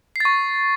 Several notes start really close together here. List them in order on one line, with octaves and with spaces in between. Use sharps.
C7 A6 C#6